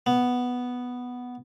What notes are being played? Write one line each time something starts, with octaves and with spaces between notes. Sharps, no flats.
B3